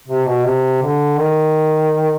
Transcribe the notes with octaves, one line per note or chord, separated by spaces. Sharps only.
C3
B2
C3
D3
D#3